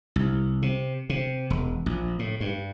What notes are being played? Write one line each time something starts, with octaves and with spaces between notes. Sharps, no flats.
C2
C3
C3
E1
A#1
A2
G2